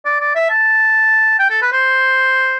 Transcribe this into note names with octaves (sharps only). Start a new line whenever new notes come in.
D5
D5
E5
A5
G5
A4
B4
C5